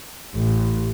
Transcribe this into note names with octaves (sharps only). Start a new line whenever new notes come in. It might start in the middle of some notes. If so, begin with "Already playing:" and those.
A1